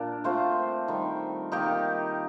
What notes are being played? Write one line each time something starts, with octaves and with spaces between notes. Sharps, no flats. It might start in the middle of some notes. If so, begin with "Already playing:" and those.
Already playing: A#2 D4
A3 C4 F4 C5
D#3 G3 C4
D#3 A#3 D#4 G4